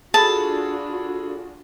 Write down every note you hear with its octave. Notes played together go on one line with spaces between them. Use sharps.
D4 F4 F#4 G#4 A4 A5 B5